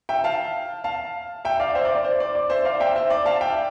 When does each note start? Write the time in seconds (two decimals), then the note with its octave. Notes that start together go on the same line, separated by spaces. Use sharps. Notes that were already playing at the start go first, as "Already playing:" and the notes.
0.09 E5 G5
0.24 F5 A5
0.84 F5 A5
1.45 E5 G5
1.60 D5 F5
1.75 C5 E5
1.85 D5
1.95 D5
2.05 C5
2.20 D5
2.35 D5
2.50 C5 E5
2.65 D5 F5
2.80 E5 G5
2.95 C5 E5
3.10 D5
3.25 F5 A5
3.41 E5 G5